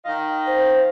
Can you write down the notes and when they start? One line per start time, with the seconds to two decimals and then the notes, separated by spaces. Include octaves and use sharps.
0.05 D#3 D#5 F5
0.46 C5